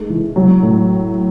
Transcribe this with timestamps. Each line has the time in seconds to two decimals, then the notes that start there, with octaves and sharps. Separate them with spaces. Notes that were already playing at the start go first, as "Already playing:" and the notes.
Already playing: G#3 A3 D#4
0.10 E3
0.36 F#3
0.62 A2